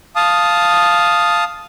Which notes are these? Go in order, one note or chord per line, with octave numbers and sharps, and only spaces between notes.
F5 A5 D#6